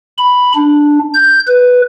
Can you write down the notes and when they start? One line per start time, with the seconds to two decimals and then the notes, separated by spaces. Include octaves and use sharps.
0.18 B5
0.55 D4
1.14 G6
1.47 B4